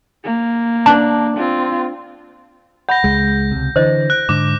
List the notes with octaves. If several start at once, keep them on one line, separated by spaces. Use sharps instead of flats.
A#3
D4 A5
C4 F4
F#5 B5 G6 A#6
C#2 G#3
C#2 C3
D3 E3 C5 D#5
F#6
G#2 D3 D6